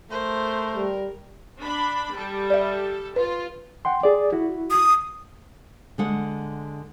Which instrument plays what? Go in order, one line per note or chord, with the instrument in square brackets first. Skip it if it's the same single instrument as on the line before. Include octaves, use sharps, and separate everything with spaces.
[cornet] A3 [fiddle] A#4 [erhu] C5
[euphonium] G3
[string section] D4 B5
G3 A4
[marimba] D5 E5
[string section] F4 [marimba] B4
[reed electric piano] F#5 G5 C6
G#4 D5
E4 F#4
[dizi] D#6
[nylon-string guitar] D3 G#3 F#5